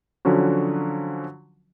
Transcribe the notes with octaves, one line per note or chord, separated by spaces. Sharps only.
D3 F3 F#3 C#4 F#4